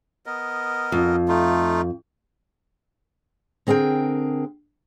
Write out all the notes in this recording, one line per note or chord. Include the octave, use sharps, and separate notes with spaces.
B3 A#4 D#5
F2
A3 D#4 F4
D3 C4 G#4 A#4 G5